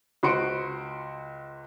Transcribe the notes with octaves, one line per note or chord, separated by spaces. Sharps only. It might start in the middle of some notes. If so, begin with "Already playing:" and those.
C#2 F#4 C5 C6 C#7 D7